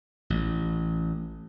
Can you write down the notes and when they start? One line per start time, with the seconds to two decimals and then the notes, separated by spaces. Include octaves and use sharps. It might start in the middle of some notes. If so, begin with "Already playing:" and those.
0.30 A1